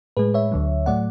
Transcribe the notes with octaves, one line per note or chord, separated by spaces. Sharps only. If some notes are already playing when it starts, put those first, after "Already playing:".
A2 G#3 G#4 B4
C#5 E5
D2 D3 F#3
A2 F#3 A3 D5 F#5